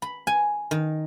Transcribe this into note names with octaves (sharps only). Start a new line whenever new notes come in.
B5
G#5
D#3